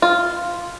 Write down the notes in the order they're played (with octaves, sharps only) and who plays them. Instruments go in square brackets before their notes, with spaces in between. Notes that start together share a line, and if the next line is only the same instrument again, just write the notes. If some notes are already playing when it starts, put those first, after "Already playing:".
[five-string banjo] F4